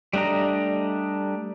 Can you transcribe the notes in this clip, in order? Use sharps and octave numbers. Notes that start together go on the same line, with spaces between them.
G3 A3 D4 D#5 A#5